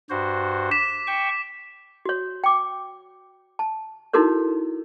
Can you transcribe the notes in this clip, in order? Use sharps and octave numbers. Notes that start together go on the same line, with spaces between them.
G2 F#4 C5
D6 B6 E7
G5 C#6
F#4 C#5
G5 D6
A5
D#4 E4 F#4 A4 A#4 C#5